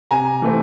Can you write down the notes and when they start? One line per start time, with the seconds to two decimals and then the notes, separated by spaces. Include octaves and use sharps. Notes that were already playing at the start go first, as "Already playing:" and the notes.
0.11 C3 G#5 A#5
0.42 E3 A3 C4